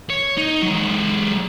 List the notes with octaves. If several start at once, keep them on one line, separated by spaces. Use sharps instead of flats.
C#5
D#4
F#3 G#3